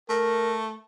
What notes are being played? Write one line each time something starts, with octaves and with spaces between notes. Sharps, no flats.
A3 A#4